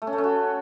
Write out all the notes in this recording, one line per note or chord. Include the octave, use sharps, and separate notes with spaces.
A3
C#4
A3
C#4
F#4